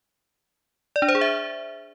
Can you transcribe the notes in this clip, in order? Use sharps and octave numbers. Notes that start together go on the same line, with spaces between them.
D5
D4
C5
G#4
E5